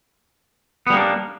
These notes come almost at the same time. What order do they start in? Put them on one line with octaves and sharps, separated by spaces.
B3 G3 A#3 D4